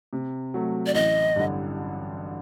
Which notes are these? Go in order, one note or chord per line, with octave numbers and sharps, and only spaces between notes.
C3
F#3 A3
D5
A1 D#5
G2 D3